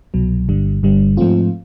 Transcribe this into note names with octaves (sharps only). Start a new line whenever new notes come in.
C2 B2 F#3
G1 G2 D3 G3
G1 G2 D3 G3
G#2 F3 A3 C4 F4